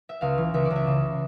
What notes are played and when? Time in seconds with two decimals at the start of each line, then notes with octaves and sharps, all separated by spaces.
0.09 E5
0.21 C#2 F5
0.38 E3
0.54 C#2 E5
0.65 D5
0.70 C#2
0.76 E5
0.87 C#3